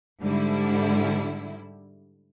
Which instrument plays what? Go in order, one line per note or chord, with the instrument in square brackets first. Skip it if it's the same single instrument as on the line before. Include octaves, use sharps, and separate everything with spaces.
[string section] G#2 D3 G3 E4